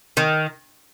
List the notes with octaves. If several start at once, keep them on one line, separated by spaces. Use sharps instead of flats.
D#3